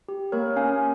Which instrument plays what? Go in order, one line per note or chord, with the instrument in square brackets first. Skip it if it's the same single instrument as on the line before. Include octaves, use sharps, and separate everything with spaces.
[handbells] G4
A#3 A#4 C#5
C#4 F5 G#5